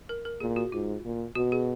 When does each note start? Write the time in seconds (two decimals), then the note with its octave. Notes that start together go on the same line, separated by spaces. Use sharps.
0.09 A#4
0.25 A#4
0.40 A#2 G#4
0.56 F#4
0.72 G#2 F4
1.04 A#2
1.35 B2 F#4
1.52 G#4